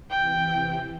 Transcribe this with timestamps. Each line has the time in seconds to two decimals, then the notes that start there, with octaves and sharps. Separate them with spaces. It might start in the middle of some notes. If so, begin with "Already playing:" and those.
0.10 C3 E3 G5